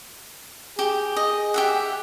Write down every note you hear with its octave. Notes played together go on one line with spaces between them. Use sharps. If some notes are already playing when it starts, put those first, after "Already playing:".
G4 G#4
D#5
G4 E5 F#5